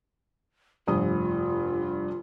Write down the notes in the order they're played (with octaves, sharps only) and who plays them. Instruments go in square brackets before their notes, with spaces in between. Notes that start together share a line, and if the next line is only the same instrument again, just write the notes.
[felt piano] F1 G2 D#6 [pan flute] F4